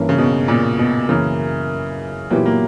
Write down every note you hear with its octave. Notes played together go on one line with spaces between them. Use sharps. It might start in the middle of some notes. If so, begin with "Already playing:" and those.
Already playing: G2 E3 A#3 C#4
C#3
B2
A#2
B2
F#2 C#3 E3 A#3 E4 A#4
A#2 E3 F#3 B3 E4 G4
A#3